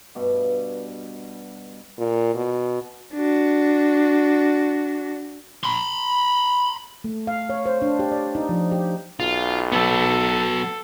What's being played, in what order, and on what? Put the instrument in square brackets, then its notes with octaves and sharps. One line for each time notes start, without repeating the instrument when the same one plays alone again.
[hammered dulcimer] G2 B2
[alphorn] A#2
B2
[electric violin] D4 F#4
[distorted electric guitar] B5 C6
[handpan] A3
F5
C#5
C5
D4
G4
D5
D#4
F3
G4
[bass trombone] B1 [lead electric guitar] F4
[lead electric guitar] F#3 B3 [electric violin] A4